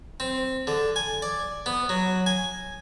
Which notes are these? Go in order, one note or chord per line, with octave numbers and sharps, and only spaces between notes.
C4
D3
G#5
D5
B3
F#3
G#5